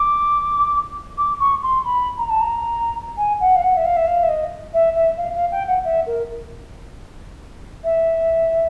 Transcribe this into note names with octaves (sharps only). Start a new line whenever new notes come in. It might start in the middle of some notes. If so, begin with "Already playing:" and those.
Already playing: D6
D6
C#6
C6
B5
A#5
A5
A#5
G#5
F#5
F5
F#5
E5
F5
E5
F5
E5
D#5
E5
E5
F5
F5
G5
F#5
E5
A#4
E5